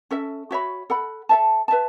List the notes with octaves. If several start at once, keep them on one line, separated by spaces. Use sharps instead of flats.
C#4 A4 E5
F#4 C#5 E5 B5
A4 F#5 B5
A4 E5 A5
B4 E5 A5